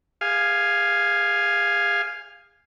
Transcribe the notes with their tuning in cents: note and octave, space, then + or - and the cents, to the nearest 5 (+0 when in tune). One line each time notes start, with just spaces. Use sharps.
G#4 -45 F5 +0 G#5 +0